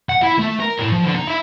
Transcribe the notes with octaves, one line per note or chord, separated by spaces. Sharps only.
F#5
E4
A3
A#4
A2
F3
D3
D#4
E4